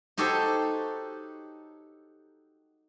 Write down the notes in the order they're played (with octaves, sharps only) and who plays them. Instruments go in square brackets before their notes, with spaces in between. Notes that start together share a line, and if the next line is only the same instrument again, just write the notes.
[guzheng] D#4 F#4 G4 A4 C5 C#5